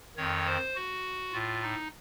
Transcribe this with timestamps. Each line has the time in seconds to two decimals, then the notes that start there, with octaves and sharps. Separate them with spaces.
0.16 F2 D#3 C#5
0.46 C5
0.76 F#4
1.33 A2 F4
1.63 D#4